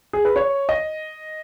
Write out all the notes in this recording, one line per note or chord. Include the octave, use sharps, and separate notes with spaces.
G#4
B4
C#5
D#5